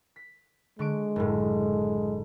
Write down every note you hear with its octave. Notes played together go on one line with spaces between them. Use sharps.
B6
D3 G#3 C#6 D7
F#1 A2